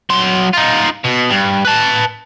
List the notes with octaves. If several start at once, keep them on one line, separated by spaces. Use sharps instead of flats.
F#3 C6
D#4 F4
B2
G2
B4 A5